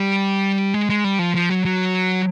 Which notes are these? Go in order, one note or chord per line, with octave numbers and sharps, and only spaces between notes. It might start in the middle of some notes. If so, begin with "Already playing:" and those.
Already playing: G3
G#3
G#3
G3
F3
F3
F#3
F#3